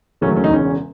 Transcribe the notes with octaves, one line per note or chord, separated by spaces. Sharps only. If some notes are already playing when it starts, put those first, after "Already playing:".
E1 D#2 C#3 F#3 A3 C#4
C#4
D#4
E1 E2 C#3 C#4